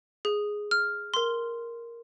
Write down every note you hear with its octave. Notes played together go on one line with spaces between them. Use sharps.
G#4
F6
A#4 C6